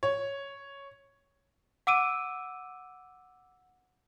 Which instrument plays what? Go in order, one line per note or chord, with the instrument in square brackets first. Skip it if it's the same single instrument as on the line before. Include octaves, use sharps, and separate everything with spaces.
[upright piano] C#5
[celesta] F#5 D6 E6 D7 D#7